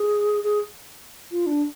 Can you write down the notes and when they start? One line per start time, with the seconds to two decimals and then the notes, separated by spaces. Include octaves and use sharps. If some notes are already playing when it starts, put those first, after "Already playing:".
Already playing: G#4
0.44 G#4
1.31 F4
1.46 D4